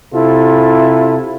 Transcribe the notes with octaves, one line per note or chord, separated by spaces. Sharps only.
C3 E4 F4 A4